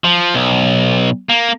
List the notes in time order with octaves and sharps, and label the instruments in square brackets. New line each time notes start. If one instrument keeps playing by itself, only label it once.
[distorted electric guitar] F3
B1
A#3